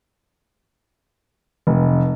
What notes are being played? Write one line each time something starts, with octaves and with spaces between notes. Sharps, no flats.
F1